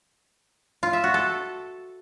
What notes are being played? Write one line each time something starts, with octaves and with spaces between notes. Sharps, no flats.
F4
E5
F#4
A4